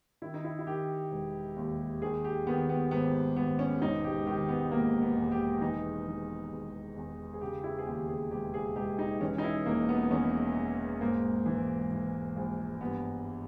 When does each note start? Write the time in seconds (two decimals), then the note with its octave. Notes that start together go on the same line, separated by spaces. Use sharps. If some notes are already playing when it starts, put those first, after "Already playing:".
0.22 D#3 E4
0.34 D#4
0.44 E4
0.59 E4
0.67 D#3 G4
1.12 E1
1.56 D#2
2.02 D#3 G#4
2.24 G4
2.47 D#3 B3
2.69 B3
2.91 G#1 B3
3.36 G#1 B3
3.59 C#4
3.81 E1 D#4
4.04 G4
4.27 D#3 G4
4.49 B3
4.71 E1 A#3
5.01 B3
5.17 E2
5.31 G4
5.61 E3 D#4
6.06 E3
6.51 E2
6.96 E2
7.34 G#4
7.41 C#3 G4
7.63 E4
7.78 G#4
7.86 D#2 G4
8.09 G#4
8.31 E1 G4
8.54 G#4
8.76 E1 G4
8.99 D#4
9.21 E3 C#4
9.38 D#4
9.44 E4
9.66 E1 A#3
9.89 B3
10.11 E2 C#4
10.56 E1
11.01 G#2 A#3
11.46 E3
11.91 E3
12.36 A#1
12.81 G2 B3